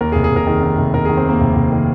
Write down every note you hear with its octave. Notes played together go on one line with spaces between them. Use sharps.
D#2 A#4
G#4
F1
G#4
F1 A#4
D#3 G#4
D#2
F1
F1 A#4
G#4
D#3
C4
D#2 A#3
F1
F1
D#3